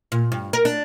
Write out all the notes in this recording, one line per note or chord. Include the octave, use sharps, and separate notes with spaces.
A#2
G2
A#4
D4